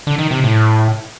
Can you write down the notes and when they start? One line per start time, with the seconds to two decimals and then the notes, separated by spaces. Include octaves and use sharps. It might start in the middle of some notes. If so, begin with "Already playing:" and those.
0.07 D3
0.19 D#3
0.31 C3
0.44 A2